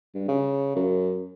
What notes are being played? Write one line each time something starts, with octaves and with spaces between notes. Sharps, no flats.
G2
C#3
F#2